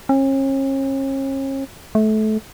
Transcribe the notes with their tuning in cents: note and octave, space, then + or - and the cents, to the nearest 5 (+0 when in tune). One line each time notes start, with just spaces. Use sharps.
C#4 -40
A3 -25